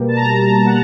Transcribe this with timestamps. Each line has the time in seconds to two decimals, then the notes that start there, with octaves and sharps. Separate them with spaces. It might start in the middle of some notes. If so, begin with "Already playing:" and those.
Already playing: B2 G3 A#3
0.08 A5
0.17 A#5
0.67 F#5